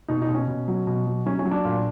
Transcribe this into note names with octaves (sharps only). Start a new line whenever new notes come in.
B2 D#4
D#4
B2
C#4
B2
F#3
B2
F#3
F#3 C#4
C#4
F#3
D4
A#2